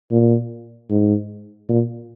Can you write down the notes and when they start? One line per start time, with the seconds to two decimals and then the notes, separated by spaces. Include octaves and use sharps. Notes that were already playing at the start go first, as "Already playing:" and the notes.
0.11 A#2
0.90 G#2
1.69 A#2